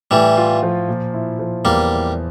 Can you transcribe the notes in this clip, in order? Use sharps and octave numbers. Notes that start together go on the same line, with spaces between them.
A2 E3 G3
F4
F3
A#2
E4
F3
E2 G3 A#3
E4